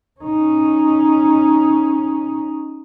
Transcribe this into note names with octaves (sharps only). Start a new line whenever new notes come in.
C#4 D#4